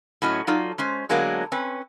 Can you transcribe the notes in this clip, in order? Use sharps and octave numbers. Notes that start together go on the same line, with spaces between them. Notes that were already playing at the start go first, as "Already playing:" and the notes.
A2 F#3 C#4 D#5
F#3 D#4 F4 A4 D5
G#3 C#4 C5
D3 F#3 G#3 A#3 B3 D4
C4 C#4 B4